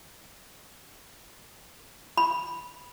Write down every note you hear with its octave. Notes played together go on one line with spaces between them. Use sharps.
B5